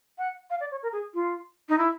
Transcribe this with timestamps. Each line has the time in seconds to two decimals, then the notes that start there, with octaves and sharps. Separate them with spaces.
0.18 F#5
0.50 F5
0.60 D5
0.71 C#5
0.83 A#4
0.92 G#4
1.14 F4
1.69 D#4
1.78 E4